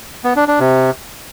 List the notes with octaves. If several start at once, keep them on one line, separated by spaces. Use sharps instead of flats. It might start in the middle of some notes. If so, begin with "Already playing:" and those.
B3
D4
D4
C3